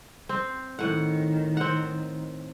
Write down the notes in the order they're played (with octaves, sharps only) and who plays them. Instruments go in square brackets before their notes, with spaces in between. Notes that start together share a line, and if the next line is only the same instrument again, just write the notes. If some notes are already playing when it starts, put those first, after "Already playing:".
[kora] C4
[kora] A2 F#5 [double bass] D#3
[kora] C4 F#5